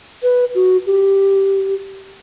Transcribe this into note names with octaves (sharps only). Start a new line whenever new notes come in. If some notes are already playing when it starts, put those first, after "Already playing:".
B4
F#4
G4